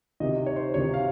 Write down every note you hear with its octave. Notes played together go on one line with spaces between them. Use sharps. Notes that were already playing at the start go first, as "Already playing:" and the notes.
C3 D#3 D#5
C#5
C5
C3 D#3 C#5
F5